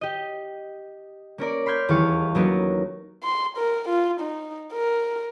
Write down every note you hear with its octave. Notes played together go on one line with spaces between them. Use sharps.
G4 D#5
A#3 C#4 A#4 D5
B5 C6 F6 G6 G#6
D#1 E2 E4 F5 C#6
F#3 A#3 B3 C#4 D#4 F#4
C6
A#4
F4
D#4
A#4